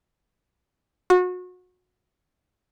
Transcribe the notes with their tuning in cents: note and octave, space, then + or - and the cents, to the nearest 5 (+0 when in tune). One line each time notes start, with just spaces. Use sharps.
F#4 -30